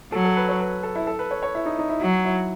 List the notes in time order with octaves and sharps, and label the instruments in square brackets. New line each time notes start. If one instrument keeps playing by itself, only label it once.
[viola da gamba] F#3 [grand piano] A4
[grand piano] A4
B4
C#5
B4
A4
E4
A4
B4
C#5
C#5
E4
D#4
D#4
E4
[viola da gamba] F#3
[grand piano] E4